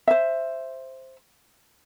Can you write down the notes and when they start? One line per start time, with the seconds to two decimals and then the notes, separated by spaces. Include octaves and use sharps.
0.07 C5 E5